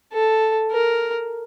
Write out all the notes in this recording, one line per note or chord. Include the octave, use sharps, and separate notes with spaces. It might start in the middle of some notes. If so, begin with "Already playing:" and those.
A4
A#4